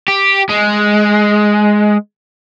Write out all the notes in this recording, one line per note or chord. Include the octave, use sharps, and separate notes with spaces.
G4
G#3